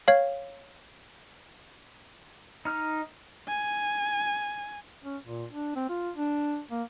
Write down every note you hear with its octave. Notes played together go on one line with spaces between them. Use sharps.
C#5 F5
D#4 F6
G#5
C#4
A#2
D4
C4
F4
D4
A#3